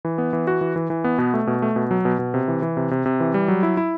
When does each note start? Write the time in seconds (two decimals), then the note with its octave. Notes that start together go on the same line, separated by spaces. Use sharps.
0.05 E3
0.18 B3
0.33 E3
0.47 F#4
0.61 E3
0.76 E3
0.90 E3
1.04 B3
1.18 B2
1.34 A3
1.47 B2
1.62 A3
1.76 B2
1.91 F#3
2.05 B2
2.19 B2
2.34 C3
2.48 E3
2.62 E3
2.77 C3
2.91 C3
3.06 C3
3.20 E3
3.34 G3
3.48 F#3
3.63 E4
3.77 E4